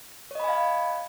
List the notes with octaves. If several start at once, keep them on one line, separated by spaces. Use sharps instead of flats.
C#5 D#5 F5 G#5 B5